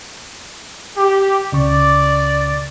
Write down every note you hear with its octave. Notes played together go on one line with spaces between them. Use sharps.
G4
C#2 C#3 D5 C#6